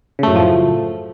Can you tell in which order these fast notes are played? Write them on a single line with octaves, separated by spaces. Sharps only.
C#3 A3 F#2 A2 F3